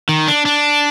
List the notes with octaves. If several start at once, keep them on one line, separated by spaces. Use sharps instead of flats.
D#3
D4
D4